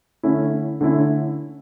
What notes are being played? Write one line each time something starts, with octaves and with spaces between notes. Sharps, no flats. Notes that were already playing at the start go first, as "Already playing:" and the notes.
D3 A3 C#4 E4
D3 A3 C#4 E4